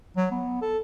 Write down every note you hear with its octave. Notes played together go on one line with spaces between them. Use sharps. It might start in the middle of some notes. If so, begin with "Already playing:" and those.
F#3
B3
A4